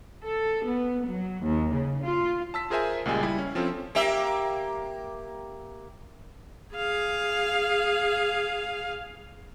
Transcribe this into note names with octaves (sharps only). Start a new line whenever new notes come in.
A4
B3
F#3
D#2
C#3
F4
A5 E6 B6
F4 G#4 A#4 C5 E5 G#5
C#2 A#2 G3 G#3 G#5
G3 E4
C#4
F3 C4 C#4 F4 A4
A#3 G4 E5
G#4 F5